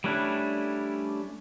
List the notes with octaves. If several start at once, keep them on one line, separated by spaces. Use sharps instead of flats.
G3 A3 C#4 D4 E4